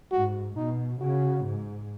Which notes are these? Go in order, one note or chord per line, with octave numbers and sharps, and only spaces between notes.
G#2 F#4
B2 D#4
C#3 F#4
G#2